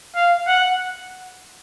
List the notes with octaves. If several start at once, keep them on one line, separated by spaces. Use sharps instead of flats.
F5
F#5